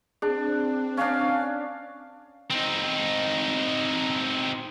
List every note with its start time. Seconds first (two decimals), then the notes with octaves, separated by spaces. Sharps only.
0.22 C4 D4 G#4
0.97 C#4 D4 F5
2.51 C4 D#4